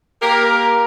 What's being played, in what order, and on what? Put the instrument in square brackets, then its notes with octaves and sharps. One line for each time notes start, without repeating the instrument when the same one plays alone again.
[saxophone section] A#3 G4 A#4